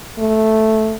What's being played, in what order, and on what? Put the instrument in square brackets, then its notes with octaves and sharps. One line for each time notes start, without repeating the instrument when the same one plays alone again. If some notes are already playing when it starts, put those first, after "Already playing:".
[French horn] A3